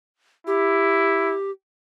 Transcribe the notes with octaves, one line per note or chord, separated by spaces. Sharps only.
E4 G4